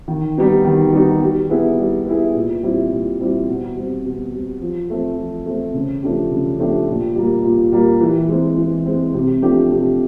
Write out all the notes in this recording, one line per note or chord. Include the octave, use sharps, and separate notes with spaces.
D#3
G3 B3 D#4 F#4
D#3
G3 B3 D#4 F#4
G3
B3 E4 G#4
G3
B3 E4 G#4
A#2
G3 C4 E4
A#2
G3 C4 E4
B2
G3 C4
B2
G3 C4
F3
A3 C4
F3
A3 C4
C#3
F3 A3 D4 G4
C#3
F3 A3 D4 G4
A#2
G3 A#3
A#2
G3 A#3
E3
G#3 C4
E3
G#3 C4
C3
F3 A3 D4 G4
C3